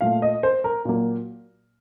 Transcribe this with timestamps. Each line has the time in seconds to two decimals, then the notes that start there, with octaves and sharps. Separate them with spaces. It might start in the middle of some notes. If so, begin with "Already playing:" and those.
0.01 A#2 A3 F5
0.22 D#5
0.43 C5
0.64 A#4
0.85 A#2 F#3 A#3